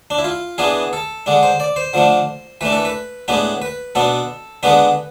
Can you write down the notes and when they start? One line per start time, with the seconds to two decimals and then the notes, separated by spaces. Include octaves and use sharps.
0.10 D4
0.18 E4
0.24 F4
0.58 E3 B3 D4 G#4
0.93 A4
1.26 D3 G#3 D4
1.43 C5
1.60 D5
1.76 C5
1.93 D3 F3 A3 D4
2.61 E3 A3 D4 B4
2.72 A4
2.85 B4
3.28 A2 G#3 B3 D4 B4
3.62 B4
3.95 B2 B3 D4 A4
4.63 D3 G#3 B3 D4 B4